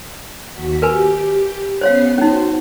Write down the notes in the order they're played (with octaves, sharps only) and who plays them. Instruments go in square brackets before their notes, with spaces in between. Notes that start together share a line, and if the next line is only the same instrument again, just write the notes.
[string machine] D#2 F#4 B6
[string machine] G4 [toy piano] A#4 B4 G#5
[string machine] B3 C#4 C7 [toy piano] C5 C#5 F5
[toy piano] C#4 D#4 [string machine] F#4 C5